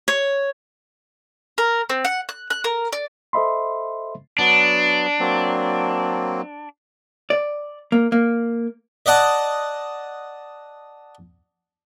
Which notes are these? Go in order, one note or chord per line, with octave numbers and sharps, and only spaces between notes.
C#5
A#4
C4
F#5
F#6
F#6
A#4
D5
A4 C5 D#5 E5 B5 C6
F#3 B3 D4
F#3 A#3 C4
D5
A#3
A#3
D5 D#5 F#5 A5